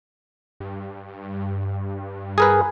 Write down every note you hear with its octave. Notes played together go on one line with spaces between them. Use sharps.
G2
G#4 A#4 B4